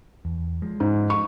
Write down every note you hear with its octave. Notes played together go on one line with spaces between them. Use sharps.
E2
F3 G#3
G#2
C#6